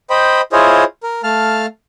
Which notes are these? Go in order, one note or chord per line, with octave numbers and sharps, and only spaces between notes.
C5 D#5 G5 B5
E4 F4 G#4 C5 C#5 D#5
A#4
A3 F5 A5 F6